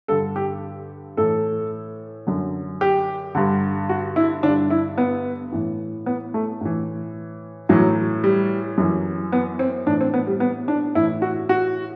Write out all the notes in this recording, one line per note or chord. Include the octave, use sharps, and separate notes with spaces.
G2 D3 A4
G4
A2 E3 A4
F#2 D3
G4
G2 D3
F#4
E4
G2 D3 D4
E4
B3
A2 E3
B3
A3
A2 E3
A2 E3 F#3
G3
F#2 E3
B3
C4
A2 E3 D4
C4
B3
G3
B3
D4
A2 E3 E4
F#4
F#4